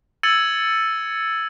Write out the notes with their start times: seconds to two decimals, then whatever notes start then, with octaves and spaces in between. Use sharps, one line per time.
0.23 E6 G#6 A6 C#7 D#7 F#7